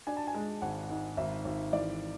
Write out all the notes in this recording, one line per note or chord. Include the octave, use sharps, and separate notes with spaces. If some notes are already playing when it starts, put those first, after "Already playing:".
D4 G#5
A5
G#5
G#3
G#1 F#5
G#2
G#1 E5
G#1
E3 D5